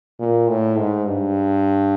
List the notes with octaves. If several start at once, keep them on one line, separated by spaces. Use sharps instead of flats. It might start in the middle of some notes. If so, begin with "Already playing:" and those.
A#2
A2
G#2
G2